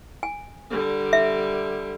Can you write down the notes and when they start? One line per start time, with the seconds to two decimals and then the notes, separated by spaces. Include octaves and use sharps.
0.23 G#5
0.70 D3 G3
1.13 E5